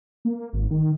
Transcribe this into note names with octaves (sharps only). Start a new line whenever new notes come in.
A#3
G#1
D#3